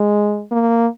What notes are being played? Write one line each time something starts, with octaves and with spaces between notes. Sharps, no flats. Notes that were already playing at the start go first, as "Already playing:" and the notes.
Already playing: G#3
A#3